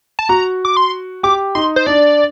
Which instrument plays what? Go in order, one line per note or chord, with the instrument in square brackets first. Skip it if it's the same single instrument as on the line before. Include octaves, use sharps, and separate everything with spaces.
[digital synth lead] A5
[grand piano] F#4 [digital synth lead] A#5
[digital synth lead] D6
C6
[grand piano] G4 [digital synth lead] D6
[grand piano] D#4 [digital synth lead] C6
[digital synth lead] C5
[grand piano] D4 [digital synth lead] D5